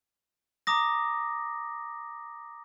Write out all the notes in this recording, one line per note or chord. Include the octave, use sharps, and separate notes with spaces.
A#5 D6 D#6 A#6